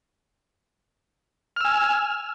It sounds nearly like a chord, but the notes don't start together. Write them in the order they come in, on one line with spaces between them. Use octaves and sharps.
F6 E6 G#5